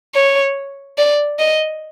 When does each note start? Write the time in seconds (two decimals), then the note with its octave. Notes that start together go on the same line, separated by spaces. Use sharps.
0.14 C#5
0.98 D5
1.39 D#5